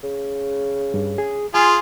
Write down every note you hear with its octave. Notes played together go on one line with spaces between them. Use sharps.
C#3
G2
G#4
F4 G#4 G#5 C6